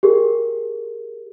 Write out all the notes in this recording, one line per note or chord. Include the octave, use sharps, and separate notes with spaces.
G4 G#4 A#4